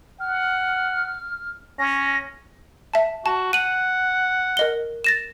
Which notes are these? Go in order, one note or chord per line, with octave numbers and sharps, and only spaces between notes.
F#5 F6
C#4 A#6
E5 A5
F#4 A5
F#5 D#7 F#7
A#4 D#5 G7
A6 A#6 E7